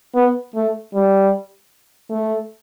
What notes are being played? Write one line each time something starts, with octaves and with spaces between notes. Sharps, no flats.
B3
A3
G3
A3